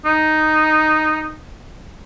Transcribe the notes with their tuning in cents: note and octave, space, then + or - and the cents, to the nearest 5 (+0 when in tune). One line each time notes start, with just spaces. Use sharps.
D#4 -5